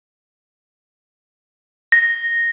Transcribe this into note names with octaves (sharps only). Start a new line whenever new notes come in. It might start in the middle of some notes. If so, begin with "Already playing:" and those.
A#6